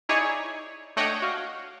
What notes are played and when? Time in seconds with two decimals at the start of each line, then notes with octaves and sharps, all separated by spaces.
0.09 D#4 E4 G#4 C#5 D5 G#5
0.97 A3 D4 C#5 D#5 F#5 G5
1.22 F#4 F5